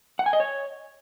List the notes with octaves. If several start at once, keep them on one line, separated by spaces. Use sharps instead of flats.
F#5
G#5
D#5
C#5